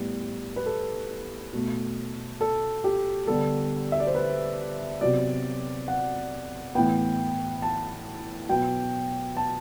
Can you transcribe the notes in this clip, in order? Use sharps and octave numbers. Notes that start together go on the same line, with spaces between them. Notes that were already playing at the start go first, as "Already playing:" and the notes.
Already playing: A2 G3 B3
B4
A4
B2 A3
A4
G4
D3 G3 B3 A4
E5
D5
C5
B4
C3 F#3 B3 D5
F#5
A2 E3 B3 G5
A5
B2 F#3 B3 G5
A5